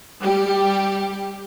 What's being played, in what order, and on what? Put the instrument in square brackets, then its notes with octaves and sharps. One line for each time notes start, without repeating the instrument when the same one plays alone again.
[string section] G3 G4